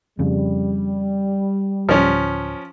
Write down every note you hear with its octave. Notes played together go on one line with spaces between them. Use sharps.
F2 C#3 G3
D1 F3 C#4